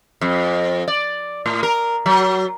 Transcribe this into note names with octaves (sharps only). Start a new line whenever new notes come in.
F2
D5
A2
A#4
F#3